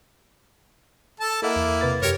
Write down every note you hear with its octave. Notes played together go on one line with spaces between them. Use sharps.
A4 A5
A#3 E4 A4 D#5 F#5
E2
C3 B4 A6
F#2 G4 A#4 C#5